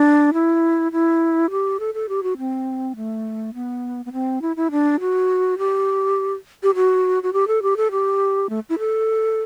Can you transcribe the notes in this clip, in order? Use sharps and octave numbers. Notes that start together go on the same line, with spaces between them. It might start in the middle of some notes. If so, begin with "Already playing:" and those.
Already playing: D4
E4
E4
G4
A4
A4
G4
F#4
C4
A3
B3
B3
C4
E4
E4
D4
F#4
G4
G4
F#4
F#4
G4
A4
G4
A4
G4
A3
E4
A4